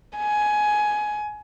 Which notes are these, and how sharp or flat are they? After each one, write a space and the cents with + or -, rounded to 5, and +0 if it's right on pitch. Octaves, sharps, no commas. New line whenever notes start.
G#5 +15